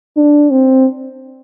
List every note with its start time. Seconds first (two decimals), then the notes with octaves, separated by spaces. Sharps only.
0.17 D4
0.51 C4